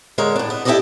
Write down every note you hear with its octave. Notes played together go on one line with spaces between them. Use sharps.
D3 G#3 A#4 C#5
A2 D4
B3
E4 G4 A4 A#4 D5 D#5